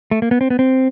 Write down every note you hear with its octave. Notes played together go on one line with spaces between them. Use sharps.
A3
A#3
B3
C4
B3
C4